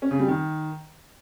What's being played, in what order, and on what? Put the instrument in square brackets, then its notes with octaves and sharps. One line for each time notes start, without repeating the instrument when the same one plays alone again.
[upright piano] C#4
C#3
G3
D#3